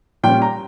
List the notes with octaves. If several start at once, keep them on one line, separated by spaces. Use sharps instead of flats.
A#2 G3 C#4 G5
A#5